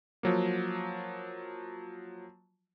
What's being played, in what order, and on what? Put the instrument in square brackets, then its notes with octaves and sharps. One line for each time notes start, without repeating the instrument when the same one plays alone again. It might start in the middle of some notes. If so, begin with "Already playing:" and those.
[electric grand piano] F3 F#3 A#3